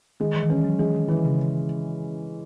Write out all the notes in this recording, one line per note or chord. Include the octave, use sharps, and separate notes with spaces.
D#3 G#3
E3
D#3
E3 C#4
F#3
E3 G#3
D#3
D#3 E3
C#3